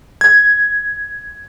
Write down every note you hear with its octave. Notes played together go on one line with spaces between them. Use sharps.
G#6